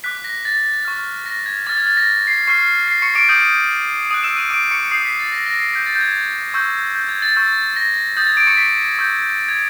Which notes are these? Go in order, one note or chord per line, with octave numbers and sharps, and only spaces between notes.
D6 F#6 B6
A#6
A6
C#6 F6
A#6
G#6
D6 F6 A6
G#6
A6
A#6
C7
C#6 F6 C7
C7
C#6 C#7
D6 D7
D6 D#6 G6 D#7
D#6 F#6 D#7
E6 E7
D#6 D#7
D6 D7
C#6 C#7
D#6 G6 C7
B6
A6
A#6
A#6
C7
D6 G6 B6
A6
G6
G#6
C#6 E6 G6
G6
G#6
A6
C#6 E6 G6
A#6
D#6 G6 A6
G#6
D6 D7
C#6 C#7
B6
C#6 E6 G6
G#6